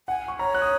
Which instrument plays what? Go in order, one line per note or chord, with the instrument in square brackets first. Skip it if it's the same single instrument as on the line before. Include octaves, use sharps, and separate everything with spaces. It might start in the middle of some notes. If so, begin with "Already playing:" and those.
[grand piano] F#5 [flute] G#5
[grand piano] C#6
[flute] C#5 [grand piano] A#5
[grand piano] F#6
D#6